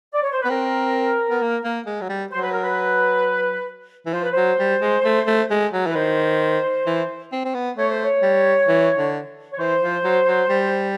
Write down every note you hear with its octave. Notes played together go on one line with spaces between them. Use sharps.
D5
C#5
C5
B3 B4
C4 A#4
B3
A#3
A#3
G#3
F#3
G3
F#3 C5
B4
A#4
B4
E3
F3 C5
B4
F#3 C5
G3
G#3
A3
A3
G#3
F#3
E3 B4
D#3 C5
E3
C4
C4
B3
A3 C#5
C5
C#5
G3
E3
D3
C#5
E3 C5
F3
F#3
F#3
G3